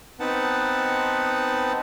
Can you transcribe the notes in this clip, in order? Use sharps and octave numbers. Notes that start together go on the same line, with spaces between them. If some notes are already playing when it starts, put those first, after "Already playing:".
B3 C4 D#4 B4 F#5 A5